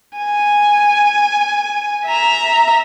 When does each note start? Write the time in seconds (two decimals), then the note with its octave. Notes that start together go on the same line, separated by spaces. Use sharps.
0.18 G#5
2.06 E5 A#5